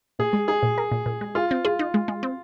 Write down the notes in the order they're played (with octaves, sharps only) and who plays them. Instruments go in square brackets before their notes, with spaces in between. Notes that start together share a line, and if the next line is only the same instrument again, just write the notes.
[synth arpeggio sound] A#2 [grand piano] G#4
[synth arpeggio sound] G#3
[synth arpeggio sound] D#4 [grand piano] G#4
[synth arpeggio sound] A#2
A#4
A#2
A#2
G#3
[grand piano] F4 [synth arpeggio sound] G#4
[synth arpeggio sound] C4
[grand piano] F4 [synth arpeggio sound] G#4
[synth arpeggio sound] D#4
G#3
G#3
C4